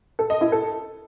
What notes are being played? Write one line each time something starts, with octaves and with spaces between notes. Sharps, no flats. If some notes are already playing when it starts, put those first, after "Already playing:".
A4
D#5
E4
A4